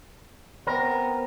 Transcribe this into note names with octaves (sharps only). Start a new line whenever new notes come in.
B3 C4 A#4